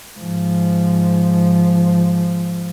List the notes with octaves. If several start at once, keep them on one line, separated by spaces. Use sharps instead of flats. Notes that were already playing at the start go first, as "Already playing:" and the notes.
G#2 F3